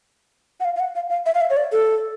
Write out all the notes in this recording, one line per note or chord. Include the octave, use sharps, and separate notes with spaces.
F#5
F5
F5
F#5
F5
F5
E5
F5
E5
C#5
D5
A4